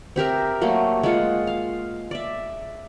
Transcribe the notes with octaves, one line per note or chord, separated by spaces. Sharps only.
C4 G4 A#4 E5
F#3 A3 A#3
G#3 F4 F#5
F5
D5 E5